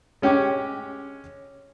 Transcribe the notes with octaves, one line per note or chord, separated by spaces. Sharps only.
G#3 C#4 G4 C#5 D6